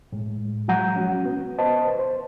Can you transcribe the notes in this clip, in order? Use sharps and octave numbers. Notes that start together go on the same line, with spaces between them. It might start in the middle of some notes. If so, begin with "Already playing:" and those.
A2 G#3
F3 F#3 G#3 F#5 A#5 G6
C#4 F#4
B3
B4 C5 D#5 A5
C5